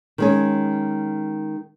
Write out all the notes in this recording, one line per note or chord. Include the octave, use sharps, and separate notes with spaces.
D#3 G#3 C#4